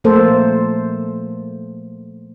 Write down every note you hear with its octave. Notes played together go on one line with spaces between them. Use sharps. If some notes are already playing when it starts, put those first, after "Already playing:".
A#2 F3 A3 A#3 A4 C5